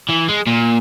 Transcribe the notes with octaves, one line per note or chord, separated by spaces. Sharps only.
E3
G#3
A#2